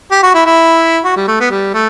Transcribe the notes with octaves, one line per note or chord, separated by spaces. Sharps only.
G4
F#4
E4
E4
F#4
G3
A3
B3
G3
A3